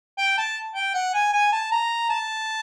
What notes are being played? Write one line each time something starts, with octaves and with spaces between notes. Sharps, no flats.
G5
A5
G5
F#5
G#5
G#5
A5
A#5
A5